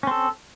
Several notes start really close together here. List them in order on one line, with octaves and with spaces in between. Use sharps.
C#4 C4 A4